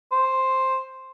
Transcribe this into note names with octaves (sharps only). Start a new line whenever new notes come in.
C5